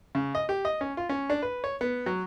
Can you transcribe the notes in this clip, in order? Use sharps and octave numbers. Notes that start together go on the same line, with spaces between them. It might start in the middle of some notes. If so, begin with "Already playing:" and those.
C#3
D#5
G4
D#5
C#4
F4
C#4
D4
B4
C#5
B3
F#3